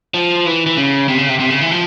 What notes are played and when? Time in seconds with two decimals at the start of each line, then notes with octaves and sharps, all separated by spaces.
0.14 F3
0.46 E3
0.66 E3
0.77 C#3
1.08 C3
1.18 C#3
1.29 C3
1.40 C3
1.50 C#3
1.61 E3
1.71 F3